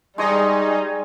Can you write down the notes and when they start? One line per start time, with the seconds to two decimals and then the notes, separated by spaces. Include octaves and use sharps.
0.18 G3 G#3 D#4 G#4 C#5